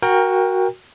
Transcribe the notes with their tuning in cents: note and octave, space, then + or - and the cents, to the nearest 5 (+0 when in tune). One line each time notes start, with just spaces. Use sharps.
F#4 +0 A#4 +10 G5 +25